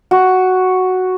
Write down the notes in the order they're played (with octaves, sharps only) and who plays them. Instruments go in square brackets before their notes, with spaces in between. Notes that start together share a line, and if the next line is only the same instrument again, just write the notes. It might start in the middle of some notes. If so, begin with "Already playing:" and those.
[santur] F#4